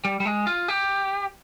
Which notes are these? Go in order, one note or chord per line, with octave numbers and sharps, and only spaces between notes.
G3
G3
G#3
F4
G4